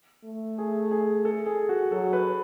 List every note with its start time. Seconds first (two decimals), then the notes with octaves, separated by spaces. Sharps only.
0.25 A3
0.58 G#4
0.91 G#4
1.25 A4
1.46 G#4
1.69 F#4
1.92 F#3 A4
2.13 B4